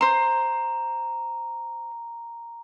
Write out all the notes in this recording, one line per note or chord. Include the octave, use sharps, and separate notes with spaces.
C5 A#5 C6